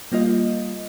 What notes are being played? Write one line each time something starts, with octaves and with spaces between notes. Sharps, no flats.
G3 A#3 F4 D#5